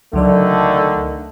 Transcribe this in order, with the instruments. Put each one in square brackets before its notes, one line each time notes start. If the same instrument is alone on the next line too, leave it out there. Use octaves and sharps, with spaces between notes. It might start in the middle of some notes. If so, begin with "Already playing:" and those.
[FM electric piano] C#2 F#3 D5 [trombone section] D3 D#3 A3